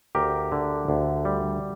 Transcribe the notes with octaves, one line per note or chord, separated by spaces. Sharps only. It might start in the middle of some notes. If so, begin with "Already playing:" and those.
D2 G4 A#4
D3
D2
G3